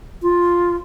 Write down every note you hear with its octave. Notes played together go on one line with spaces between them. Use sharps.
F4